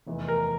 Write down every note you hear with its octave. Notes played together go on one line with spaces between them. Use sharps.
F1 E2 E3
A#4